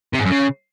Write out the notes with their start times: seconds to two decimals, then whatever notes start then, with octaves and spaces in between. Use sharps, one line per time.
0.13 C3
0.19 G#2
0.25 F#2
0.30 C#3